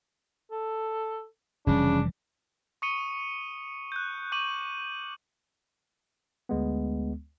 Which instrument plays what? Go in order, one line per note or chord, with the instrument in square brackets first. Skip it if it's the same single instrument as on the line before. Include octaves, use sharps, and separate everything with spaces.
[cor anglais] A4
[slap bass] F1 E3 G3 [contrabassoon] C#3 [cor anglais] D4
[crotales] C#6 D#6 C#7 D#7 G7
F#6 G6
C#6 D6 F#6 D#7 F#7
[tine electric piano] D2 G#3 B3